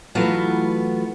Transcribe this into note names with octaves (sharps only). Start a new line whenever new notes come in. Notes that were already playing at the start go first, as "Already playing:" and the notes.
E3 F#3 A3 B3 F4